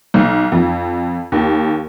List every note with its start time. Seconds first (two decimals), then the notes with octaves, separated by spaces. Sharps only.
0.14 B1
0.52 F2
1.32 D#2